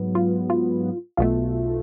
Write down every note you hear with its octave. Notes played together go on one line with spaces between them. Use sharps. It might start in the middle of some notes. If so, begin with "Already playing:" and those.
Already playing: G#2 F#3 B3
F4
F4
B1 B2 A3 F4